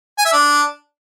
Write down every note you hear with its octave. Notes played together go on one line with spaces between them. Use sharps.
G#5
E5
D4